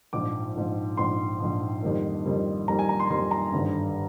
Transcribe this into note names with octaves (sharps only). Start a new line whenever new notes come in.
A#1 G#2 F3 D6
A#1 G#2 F3
A#1 G#2 F3 C6
A#1 G#2 F3
F2 D#3 G3 A#3
F2 D#3 G3 A#3
F2 D#3 G3 A#3 A#5
G#5
A#5
C6
F2 D#3 G3 A#3 C6
A#5
G#1 G2 D3